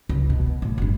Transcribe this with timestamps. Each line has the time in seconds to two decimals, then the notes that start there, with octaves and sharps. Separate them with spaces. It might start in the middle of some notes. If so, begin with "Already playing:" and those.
0.09 C#2
0.30 B2
0.62 A2
0.78 F#1 D4